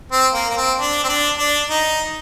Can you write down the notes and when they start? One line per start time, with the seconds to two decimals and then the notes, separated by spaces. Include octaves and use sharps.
0.12 C4
0.34 A#3
0.51 A#3
0.57 C4
0.80 D4
1.04 C4
1.09 D4
1.39 D4
1.70 D#4